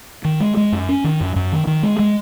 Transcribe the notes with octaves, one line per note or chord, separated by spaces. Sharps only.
D#3
G#3
G#3
F#2
C#4
D#3
F#2
F#2
D#3
D#3
G#3
G#3